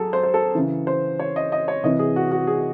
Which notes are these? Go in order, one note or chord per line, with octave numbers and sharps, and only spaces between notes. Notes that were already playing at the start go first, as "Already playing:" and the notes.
Already playing: F#3 G#4 A4
C5
C5
A4
C#3 E3
C5
C#5
D#5
D#5
C#5
C3 E3 D#5
G#4
F#4
F#4
G#4